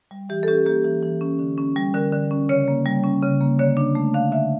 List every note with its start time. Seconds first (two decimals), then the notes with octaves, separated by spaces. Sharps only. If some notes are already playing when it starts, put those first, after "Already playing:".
0.11 G3
0.29 E3 G4
0.43 A4
0.48 C#4 G4
0.66 A#3 G4
0.84 E3
1.03 E3
1.21 C#4
1.39 D3
1.58 C#4
1.76 G3
1.94 D3 A#4
2.12 D3
2.31 C#4
2.49 C#3 C#5
2.68 A#3
2.86 G3
3.04 C#4
3.23 C#3
3.41 A#3
3.59 D3 C#5
3.77 D4
3.95 A3
4.14 D3 F5
4.32 D3 E5